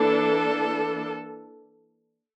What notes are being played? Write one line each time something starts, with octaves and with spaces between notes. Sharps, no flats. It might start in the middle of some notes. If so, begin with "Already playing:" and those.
Already playing: E3 A#3 D4 A4